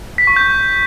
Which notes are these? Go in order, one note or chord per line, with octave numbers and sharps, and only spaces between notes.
B6
C#6
G6